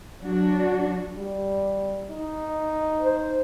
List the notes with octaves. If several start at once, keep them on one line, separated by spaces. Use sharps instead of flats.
F#3 D4 F#4
G3
D#4
C5